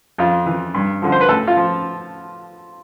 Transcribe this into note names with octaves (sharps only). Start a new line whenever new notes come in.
F2 F4
E3
G2
D3 F3
C5
B4
A2 A4
F4
F3